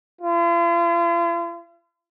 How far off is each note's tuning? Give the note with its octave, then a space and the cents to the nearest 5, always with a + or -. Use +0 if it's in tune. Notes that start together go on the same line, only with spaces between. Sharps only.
F4 -45